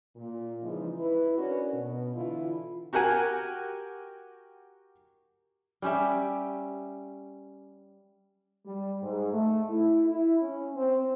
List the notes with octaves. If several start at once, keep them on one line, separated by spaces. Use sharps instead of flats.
A#2
C#3 E3 F3 G#3 D#4
E4 B4
C#4 D4 F#4 A#4 C#5 D5
B2
D3 E3 E4 F4
F#4 G4 A#4 F#5 G#5
G3 C#4 G4 E5
G3
G#2
A3
E4
E4
C#4
C4